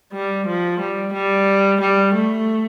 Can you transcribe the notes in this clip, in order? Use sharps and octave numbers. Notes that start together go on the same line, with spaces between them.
G3
F3
G3
G3
G3
A3